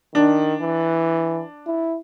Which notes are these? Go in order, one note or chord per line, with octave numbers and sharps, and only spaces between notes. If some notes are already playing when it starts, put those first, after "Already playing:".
D#3 D4
E3
E4